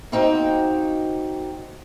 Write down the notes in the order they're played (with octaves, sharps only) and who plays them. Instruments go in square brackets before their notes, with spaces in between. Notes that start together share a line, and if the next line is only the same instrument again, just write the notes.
[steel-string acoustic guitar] A#3 C4 D#4 F#4 G5